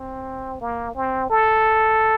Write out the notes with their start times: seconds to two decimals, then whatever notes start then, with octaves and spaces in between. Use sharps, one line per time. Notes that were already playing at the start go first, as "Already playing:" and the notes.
Already playing: C4
0.61 A#3
0.95 C4
1.30 A4